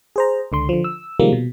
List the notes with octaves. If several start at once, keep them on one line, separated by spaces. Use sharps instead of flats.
G#4 C5 A#5
C#2 D3 C6
D3 F3
E6
C3 D#3 F3 G3 G#3 A#3
B2